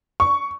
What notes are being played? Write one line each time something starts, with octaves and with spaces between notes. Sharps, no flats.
C#6